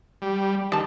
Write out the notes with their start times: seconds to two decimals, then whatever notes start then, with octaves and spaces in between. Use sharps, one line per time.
0.22 G3
0.72 D#3 G3 A5